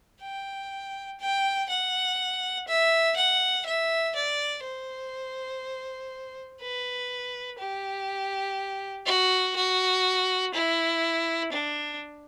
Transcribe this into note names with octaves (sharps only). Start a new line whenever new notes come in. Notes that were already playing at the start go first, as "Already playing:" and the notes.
G5
G5
F#5
E5
F#5
E5
D5
C5
B4
G4
F#4
F#4
E4
D4